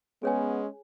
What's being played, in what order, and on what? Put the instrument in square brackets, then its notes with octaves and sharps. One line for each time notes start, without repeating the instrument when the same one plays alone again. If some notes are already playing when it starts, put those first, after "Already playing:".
[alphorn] G#3 [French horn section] B3 [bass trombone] C#4 [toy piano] G#4 C#5 G#5